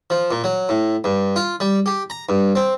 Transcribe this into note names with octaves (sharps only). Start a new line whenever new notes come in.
F3
A#2
F#3
A2
G2
F4
G3
G4
A#5
G2
C4